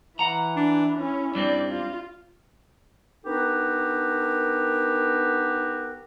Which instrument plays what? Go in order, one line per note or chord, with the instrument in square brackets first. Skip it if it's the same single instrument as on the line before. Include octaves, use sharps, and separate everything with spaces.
[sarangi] E3 [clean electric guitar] F#5 A#5
[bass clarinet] D4
[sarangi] C#4 [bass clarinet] E4
[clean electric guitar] G2 G3 C4 [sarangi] D5
[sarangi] F4
[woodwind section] B3 D4 D#4 F#4 G4 A#4